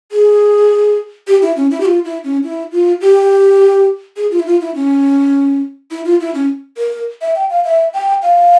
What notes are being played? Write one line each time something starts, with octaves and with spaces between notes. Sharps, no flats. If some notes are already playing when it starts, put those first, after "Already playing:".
G#4
G4
E4
C#4
E4
G4
F4
E4
C#4
E4
F4
G4
G#4
F4
E4
F4
E4
C#4
E4
F4
E4
C#4
A#4
E5
G5
F5
E5
G5
F5